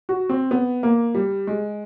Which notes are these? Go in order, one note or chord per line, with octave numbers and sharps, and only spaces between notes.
F#4
C4
B3
A#3
G3
G#3